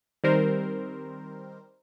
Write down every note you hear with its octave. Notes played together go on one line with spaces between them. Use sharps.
D#3 G3 C4 A#4 C5